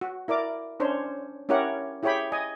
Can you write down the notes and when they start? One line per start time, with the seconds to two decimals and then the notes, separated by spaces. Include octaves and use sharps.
0.01 F#4
0.28 E4 A#4 D5 D6
0.80 C#4 D4 C5 C#5
1.49 C#4 E4 G4 A#4 C#5 F#5
2.03 E4 G4 G#4 C#5 G5 B5
2.32 D#5 G#5